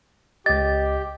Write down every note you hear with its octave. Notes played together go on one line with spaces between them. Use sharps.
C#2 G4 D#5 A6